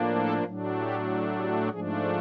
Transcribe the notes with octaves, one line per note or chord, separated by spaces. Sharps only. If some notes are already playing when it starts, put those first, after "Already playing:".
Already playing: A2 F3 A#3 D4
A4
A2 F#3 A3 D4
G4
G4
G#2 F3 A3 D4 G#4